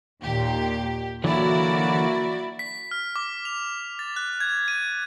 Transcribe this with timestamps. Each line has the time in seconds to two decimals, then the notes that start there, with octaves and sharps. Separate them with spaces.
0.22 D#2 A#2 G4
1.24 D3 E3 F#3 A#3 E4 F#4 D5
2.59 B6
2.91 F6
3.16 D6
3.45 F7
3.99 A6
4.16 F#6
4.40 G#6
4.68 D#7